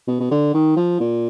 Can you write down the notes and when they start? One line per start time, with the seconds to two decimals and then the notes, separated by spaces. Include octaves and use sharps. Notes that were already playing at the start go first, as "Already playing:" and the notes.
0.08 B2
0.20 B2
0.31 D3
0.54 D#3
0.77 F3
1.00 A#2